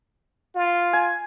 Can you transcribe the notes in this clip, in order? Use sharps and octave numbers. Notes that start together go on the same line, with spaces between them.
F4
G#5